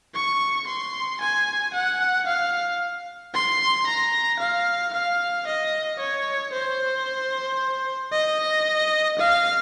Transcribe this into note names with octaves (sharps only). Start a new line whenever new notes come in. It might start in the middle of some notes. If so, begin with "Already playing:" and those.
C#6
C6
G#5
F#5
F5
C6
A#5
F5
F5
D#5
C#5
C5
D#5
F5